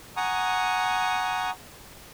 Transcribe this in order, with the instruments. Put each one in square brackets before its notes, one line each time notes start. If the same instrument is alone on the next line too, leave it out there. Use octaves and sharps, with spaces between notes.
[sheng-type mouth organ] F#5 G#5 A#5 C#6 D#6